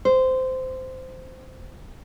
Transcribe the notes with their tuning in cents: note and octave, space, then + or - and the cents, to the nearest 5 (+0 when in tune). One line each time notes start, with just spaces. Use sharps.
C5 -15